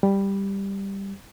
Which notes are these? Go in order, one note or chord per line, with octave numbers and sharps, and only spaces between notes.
G3